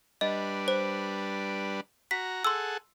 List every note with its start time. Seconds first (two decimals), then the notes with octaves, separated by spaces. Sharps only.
0.21 G3 D4 B4 D#5
0.68 C5
2.11 F#4 A#5 B6
2.44 G#4 A4 F#5 C6 E6